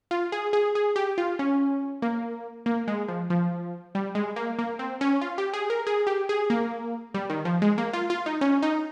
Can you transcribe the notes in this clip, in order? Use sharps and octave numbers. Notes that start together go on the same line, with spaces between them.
F4
G#4
G#4
G#4
G4
F4
C#4
A#3
A#3
G#3
F3
F3
G3
G#3
A#3
A#3
C4
C#4
F4
G4
G#4
A#4
G#4
G4
G#4
A#3
G3
D#3
F3
G#3
A#3
F4
F4
D#4
C#4
D#4